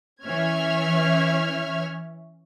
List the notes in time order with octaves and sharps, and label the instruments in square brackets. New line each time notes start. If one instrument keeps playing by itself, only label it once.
[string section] E3 C#4 C#5 E5 F6 G#6